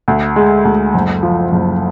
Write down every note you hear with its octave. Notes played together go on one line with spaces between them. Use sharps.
D2
G#3
D2
F#1
F3
F#1